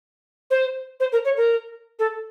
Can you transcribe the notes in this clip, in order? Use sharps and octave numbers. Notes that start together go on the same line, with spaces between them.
C5
C5
A#4
C#5
A#4
A4